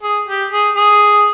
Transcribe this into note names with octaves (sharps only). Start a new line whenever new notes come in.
G#4
G4
G#4
G#4